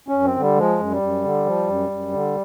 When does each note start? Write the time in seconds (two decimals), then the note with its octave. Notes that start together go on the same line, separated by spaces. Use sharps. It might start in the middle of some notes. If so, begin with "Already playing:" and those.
0.08 F#2 C#4
0.24 C4
0.36 D3 G3
0.57 F3 G#3
0.79 F#2
0.91 G3
1.02 F#2
1.24 D3
1.46 F3
1.68 F#2
1.90 F#2
2.13 D3